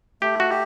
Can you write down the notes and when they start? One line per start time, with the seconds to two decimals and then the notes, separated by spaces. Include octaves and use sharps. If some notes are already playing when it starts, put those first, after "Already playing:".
0.22 A3 G4
0.40 F#4
0.50 G4